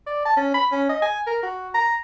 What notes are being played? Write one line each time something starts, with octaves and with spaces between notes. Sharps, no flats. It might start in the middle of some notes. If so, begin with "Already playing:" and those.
D5
A5
C#4
B5
C#4
D#5
G#5
A#4
F#4
A#5